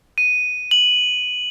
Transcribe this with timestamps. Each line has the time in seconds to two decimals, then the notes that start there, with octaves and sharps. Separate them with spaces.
0.18 D#7
0.71 F#7